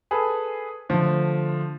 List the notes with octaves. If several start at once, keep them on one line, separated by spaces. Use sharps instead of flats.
G#4 A4 B4
D3 F3 A3